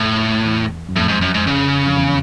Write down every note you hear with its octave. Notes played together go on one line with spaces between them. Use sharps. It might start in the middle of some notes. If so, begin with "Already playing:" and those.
Already playing: F2 A2
E2
F#2
F2 A2
G#2
F#2
G#2
C#3
F2
E2